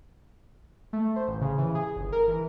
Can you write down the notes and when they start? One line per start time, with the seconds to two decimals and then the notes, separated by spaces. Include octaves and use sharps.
0.93 A3
1.16 C5
1.27 A1
1.41 C#3
1.58 E3
1.75 G#4
1.96 G1
2.12 A#4
2.28 E3